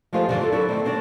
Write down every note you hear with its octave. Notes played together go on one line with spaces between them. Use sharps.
F3 G#3 A3 F4 G4 C5
E2 G#2 D3 F3 G#3 D5
F4 A4
F#3 E4 F#4 A4 D5
D#3 A3 C4
C4 D4 C#5